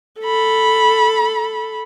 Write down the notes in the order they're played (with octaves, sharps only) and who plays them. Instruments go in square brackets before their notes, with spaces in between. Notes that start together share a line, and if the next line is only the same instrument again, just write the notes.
[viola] A4 B5